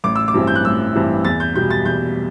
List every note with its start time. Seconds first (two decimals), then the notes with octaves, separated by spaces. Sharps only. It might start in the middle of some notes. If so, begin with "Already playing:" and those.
0.04 A1 D6
0.16 E6
0.28 D6
0.34 G2 E3 G3 C4
0.47 G6
0.55 F#6
0.64 A1 E6
0.94 G2 E3 G3 C4
1.25 E2 A6
1.40 G6
1.55 B2 G3 G6
1.71 A6
1.85 E2 G6